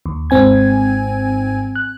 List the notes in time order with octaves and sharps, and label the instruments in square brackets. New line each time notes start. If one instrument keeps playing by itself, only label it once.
[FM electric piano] D#2
G#1 G#2 C4 G#5 G#6
F#6